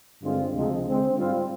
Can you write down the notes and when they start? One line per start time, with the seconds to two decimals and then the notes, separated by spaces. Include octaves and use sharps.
0.23 G2 D3 G#3 C4 F4
0.54 D2 C3 F3 G#3
0.86 D3 G#3 C4
1.17 G#2 G3 C4 F4